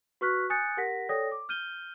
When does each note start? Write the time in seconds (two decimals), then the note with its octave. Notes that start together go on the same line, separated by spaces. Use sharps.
0.21 F#4 B4 C#6 F6 F#6 B6
0.50 G#5 D#6 F#6 G6 A6 C#7
0.77 G4 A#4 F#5 A#6 B6
1.09 A4 C#5 D5 G5 D#6 A#6
1.32 D6
1.49 F6 G6 D#7 G7